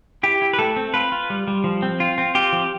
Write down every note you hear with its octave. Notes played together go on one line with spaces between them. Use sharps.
E4 G4
E4
B4
A3 A4
C4
F4 B4
F4
G3
G3
F3
C4
F4
C4
F4 G4
F3